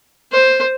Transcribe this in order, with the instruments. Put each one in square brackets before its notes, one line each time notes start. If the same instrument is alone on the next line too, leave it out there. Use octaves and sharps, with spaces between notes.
[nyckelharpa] C5